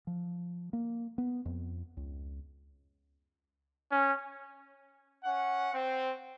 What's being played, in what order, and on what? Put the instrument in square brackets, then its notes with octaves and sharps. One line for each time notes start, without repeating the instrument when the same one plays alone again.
[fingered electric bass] F3
A#3
B3
F2
C#2
[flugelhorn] C#4
[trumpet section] C#4 F#5
C4